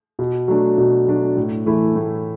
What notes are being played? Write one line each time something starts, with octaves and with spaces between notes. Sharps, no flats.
B2
F#3 A3 D4
B2
F#3 A3 D4
A2
E3 A3 E4
A2